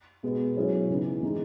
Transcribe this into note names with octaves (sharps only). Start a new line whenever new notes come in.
B2 G#3 B3
B2 F#3 C#4 E4 G#4
C#3 E3 B3 D#4
D#3 G#3 D#4